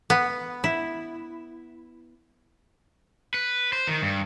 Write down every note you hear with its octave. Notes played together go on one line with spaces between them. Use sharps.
B3
E4
B4
C5
D#3
G2